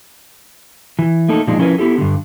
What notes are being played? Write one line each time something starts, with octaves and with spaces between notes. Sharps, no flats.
E3
A3 A#3 D#4 A4
A#2 F3 G#3 D4 D#4
F3 C#4 E4 A#4 B4
B3 E4 G4 A4
G2 D3